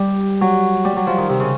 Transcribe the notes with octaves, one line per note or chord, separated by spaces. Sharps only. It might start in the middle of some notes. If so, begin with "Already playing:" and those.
Already playing: G3
F#3
G3
F#3
F3
D#3
C3
C#3